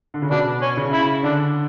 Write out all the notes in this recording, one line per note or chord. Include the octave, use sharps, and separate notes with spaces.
D3
C#3
B2 D4
C#4
C#3
E4
D3 D4